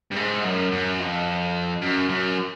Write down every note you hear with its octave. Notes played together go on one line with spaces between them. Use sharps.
G2
G#2
F#2
F#2
F2
F#2
F#2